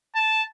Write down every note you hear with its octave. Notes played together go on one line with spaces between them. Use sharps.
A5